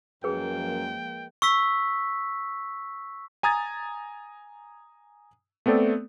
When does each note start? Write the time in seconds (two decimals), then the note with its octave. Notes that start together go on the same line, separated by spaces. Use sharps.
0.24 F#2 F3 G#3 A#3 G#4 B4 G5
1.42 C#6 E6 B6
3.43 G#5 A#5 D#6 G#6 A6
5.66 A3 B3 C4 A4 D5